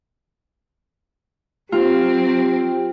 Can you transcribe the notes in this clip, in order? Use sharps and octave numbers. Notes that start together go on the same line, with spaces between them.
F#3 C4 F4 G4